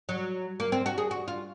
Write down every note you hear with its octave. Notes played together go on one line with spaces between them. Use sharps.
F#3
A#3
C4
F#4
G#4
F#4
F4